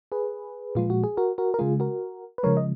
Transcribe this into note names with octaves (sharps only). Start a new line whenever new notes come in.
G#4 B4
A#2 F3 G#3 F4
F#4
G#4
F#4 A#4
F#4 A#4
A#4
C#3 G#3 F4 G#4
F#4 A#4
B4
C#3 F3 G#3 A#4 C#5
D#5